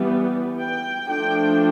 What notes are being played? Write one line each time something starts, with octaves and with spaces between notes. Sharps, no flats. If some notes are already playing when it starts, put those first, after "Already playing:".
Already playing: E3 G3 B3
G5
F3 A3 D4 G5